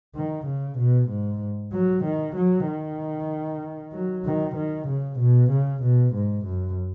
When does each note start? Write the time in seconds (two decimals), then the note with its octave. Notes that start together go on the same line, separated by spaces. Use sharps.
0.16 D#3
0.46 C#3
0.78 B2
1.09 G#2
1.72 F#3
2.05 D#3
2.36 F#3
2.67 D#3
3.93 F#3
4.25 D#3
4.56 D#3
4.88 C#3
5.19 B2
5.50 C#3
5.83 B2
6.14 G#2
6.45 F#2